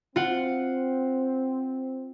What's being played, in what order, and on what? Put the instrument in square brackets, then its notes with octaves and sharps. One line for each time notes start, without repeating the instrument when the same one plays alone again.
[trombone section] C4 [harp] F4 F#5